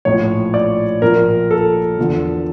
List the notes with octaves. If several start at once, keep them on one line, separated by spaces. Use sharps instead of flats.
A#1 A2 F3 C#5
D5
A#1 A#2 F3 A#4
A4
E2 D3 F3